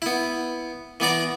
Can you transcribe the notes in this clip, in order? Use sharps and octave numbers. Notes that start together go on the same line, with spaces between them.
B3 E4
E3 B3 D5 A#5